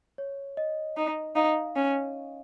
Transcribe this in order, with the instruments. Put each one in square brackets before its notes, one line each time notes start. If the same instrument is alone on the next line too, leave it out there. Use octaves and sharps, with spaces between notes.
[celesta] C#5
D#5
[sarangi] D#4
[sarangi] D#4 [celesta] F5
[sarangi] C#4